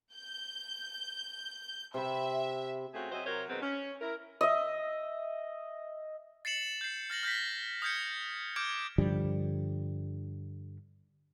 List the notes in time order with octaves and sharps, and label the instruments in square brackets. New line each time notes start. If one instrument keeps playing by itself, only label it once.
[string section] G6
[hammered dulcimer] C3 B5 [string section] E5
[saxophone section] A3 C4 C#4 F4 F#4 G#4
F#3 C4 G#4 C5 D#5 E5
C3 F#3 A#4 C5 C#5
B2 D#3 F#3 G#3 C4 B4
C#4
E4 A#4
[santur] D#5 E5
[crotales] A6 C7 C#7 E7 F#7
G6 C7
F6 A6 A#6 F#7
F6 G6 A#6 B6
D#6 F6 G6 G#6 C#7
D6 F6 G6 G#6 D7
[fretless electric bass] G2 D3 F3 G3